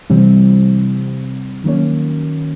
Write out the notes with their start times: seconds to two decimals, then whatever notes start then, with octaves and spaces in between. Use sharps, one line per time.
0.10 C3 E3 G3 C4
1.64 D#3 F#3 A#3 C#4